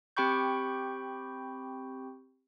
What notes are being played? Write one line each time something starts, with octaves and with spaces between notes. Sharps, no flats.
C4 G4 G5 B5 C#6 G6